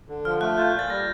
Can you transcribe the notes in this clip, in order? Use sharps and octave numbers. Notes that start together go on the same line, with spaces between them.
D3
F3 F6
A3 F#6
F4 G6
A#2
A6
G3 A#6